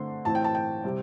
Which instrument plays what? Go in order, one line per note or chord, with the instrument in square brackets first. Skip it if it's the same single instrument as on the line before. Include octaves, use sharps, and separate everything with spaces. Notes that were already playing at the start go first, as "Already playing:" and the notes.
Already playing: [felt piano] D3 A3 C4 C6
A2 E3 C4 A5
G5
A5
G5
C3 G3 C4